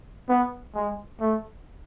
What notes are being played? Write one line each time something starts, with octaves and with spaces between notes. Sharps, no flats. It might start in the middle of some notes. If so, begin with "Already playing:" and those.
B3
G#3
A3